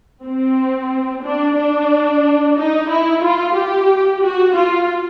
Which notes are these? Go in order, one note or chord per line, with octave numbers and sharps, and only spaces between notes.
C4
D4
D4
D#4
E4
F4
G4
F#4
F4